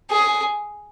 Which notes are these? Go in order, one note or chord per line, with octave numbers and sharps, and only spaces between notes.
G#4